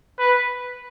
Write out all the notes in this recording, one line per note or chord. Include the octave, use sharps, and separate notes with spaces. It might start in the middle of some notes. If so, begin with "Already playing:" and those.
B4